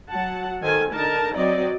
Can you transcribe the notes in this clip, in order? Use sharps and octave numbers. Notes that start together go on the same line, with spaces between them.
F#3 F#5 A5
D#3 A4 C5 G#5
D3 D#4 A#4 A5 A#5
F#3 C4 D5 D#5